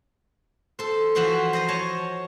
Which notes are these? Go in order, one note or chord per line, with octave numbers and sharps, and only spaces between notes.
A4 C5
E3 F3 F#4 C5 A5
C5 D#5 A#5
C#5 D#5 A5